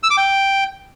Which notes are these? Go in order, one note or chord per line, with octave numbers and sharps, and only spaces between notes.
E6
D6
G5